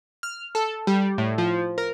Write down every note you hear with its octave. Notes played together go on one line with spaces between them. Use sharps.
F6
A4
G3
A2
F3
A#4